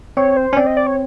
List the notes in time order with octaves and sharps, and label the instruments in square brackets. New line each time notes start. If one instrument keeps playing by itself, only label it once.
[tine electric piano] C4 [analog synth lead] C#5
[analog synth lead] C5
[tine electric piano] C#4
[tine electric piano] C4 [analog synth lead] D5
[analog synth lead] D#5
D5
C#5